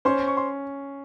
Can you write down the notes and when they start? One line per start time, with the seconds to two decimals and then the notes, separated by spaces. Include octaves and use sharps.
0.05 C#4 C5 C6
0.28 C#6
0.37 C6